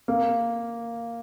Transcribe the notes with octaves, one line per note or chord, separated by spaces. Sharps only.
A#3